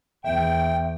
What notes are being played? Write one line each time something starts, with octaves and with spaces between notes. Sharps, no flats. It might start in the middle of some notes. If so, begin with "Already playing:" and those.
E2 E5 G5